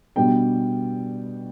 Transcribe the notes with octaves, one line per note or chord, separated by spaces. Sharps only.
B2 G3 B3 D4 G5